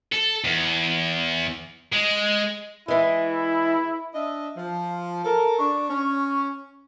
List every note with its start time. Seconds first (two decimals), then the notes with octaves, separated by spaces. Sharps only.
0.12 A4
0.44 E2
1.92 G#3
2.88 E3 G#3 E4
4.14 D4 D#5 E5
4.57 F3
5.25 A4 A#4
5.59 D4 C#6
5.90 C#4